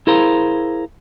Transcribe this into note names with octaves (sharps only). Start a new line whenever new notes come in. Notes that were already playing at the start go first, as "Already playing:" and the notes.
E4 G#4 A#4 C5 F5 A#5